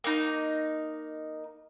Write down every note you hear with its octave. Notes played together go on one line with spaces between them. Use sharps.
A#3 D#4